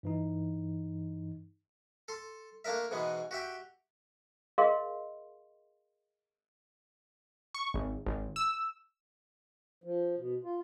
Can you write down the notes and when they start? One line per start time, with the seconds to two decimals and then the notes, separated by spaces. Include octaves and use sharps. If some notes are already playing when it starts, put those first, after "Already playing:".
0.03 G2 E3 D#4
2.08 A4 C6
2.65 A3 A#3 D4 A#4 E5
2.91 G#2 B2 E3 G#3 B3
3.31 F#4 G4 E5 G5
4.58 G#4 A#4 D#5 F5 C6
7.54 C#6
7.74 G#1
8.06 G#1
8.36 E6
9.84 F3
10.17 B2
10.44 F4